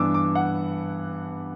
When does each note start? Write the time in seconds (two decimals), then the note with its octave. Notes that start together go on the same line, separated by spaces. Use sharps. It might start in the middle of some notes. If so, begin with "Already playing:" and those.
Already playing: G2 E3 B3 D4 D6 E6
0.14 D6
0.35 F#5